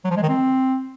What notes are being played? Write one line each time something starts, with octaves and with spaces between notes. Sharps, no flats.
F#3
F3
G#3
D#3
C4